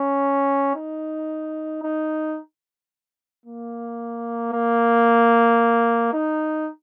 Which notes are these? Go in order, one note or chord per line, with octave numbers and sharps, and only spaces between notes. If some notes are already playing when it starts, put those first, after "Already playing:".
Already playing: C#4
D#4
D#4
A#3
A#3
D#4